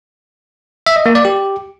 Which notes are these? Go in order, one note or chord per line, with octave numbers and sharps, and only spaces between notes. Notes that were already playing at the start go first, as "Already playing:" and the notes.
E5
D#5
A#3
D5
G4